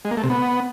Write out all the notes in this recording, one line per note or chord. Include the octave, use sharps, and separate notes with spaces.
G#3
A#3
A3
C3
B3